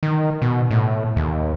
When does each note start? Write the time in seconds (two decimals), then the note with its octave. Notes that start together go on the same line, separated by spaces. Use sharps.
0.03 D#3
0.42 B2
0.71 A2
1.16 D#2